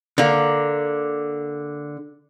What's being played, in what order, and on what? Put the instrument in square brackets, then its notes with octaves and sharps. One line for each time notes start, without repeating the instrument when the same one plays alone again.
[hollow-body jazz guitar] D3 A#3